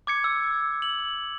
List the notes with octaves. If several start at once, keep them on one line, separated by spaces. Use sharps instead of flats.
D6 G#6 C#7
E6
F#7